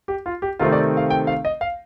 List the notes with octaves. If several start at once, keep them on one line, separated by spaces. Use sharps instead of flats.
G4
F4
G4
C3 D#3 A3 C4 F4
D5
F5
G5
F5
D#5
F5